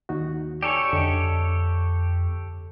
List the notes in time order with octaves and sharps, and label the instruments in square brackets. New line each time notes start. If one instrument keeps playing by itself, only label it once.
[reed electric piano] D#2 D#4 F#4
[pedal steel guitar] G4 A4 C#5 [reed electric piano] D5 G#5
[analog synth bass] F2 [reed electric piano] D3 D#5